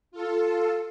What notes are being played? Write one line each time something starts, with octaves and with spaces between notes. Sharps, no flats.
F4 A4